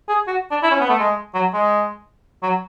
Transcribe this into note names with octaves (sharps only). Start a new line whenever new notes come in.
G#4
F#4
D4
E4
C#4
B3
A3
G#3
F#3
G#3
F#3